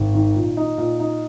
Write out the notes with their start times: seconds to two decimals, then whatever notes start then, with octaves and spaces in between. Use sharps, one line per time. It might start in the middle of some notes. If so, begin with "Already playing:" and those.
Already playing: G#1
0.14 D#3
0.35 A#2
0.57 D#4
0.78 A#2
1.00 D#4